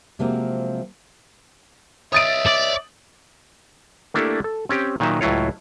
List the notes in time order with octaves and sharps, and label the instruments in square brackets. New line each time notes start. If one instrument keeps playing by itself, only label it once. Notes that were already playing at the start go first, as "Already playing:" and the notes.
[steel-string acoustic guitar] C3 F3 F#3 G#3 A#3 C4
[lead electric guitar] C#5 D#5 [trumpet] E5 [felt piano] D#6 A6 D7
[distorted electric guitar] D5
[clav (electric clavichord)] A3 A#3 D4 E4 G4 A4
A4
C4 C#4 G4
A#2 D#3 F#3 D#4 E5
C#2 A2 F#3 E4 F4 C#5